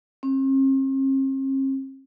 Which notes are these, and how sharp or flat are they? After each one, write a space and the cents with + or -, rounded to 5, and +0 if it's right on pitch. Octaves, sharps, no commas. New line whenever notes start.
C4 +45